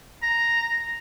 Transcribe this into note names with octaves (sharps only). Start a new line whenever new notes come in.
A#5